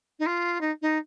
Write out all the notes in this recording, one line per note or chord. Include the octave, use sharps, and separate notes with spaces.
D#4
F4
D#4
D#4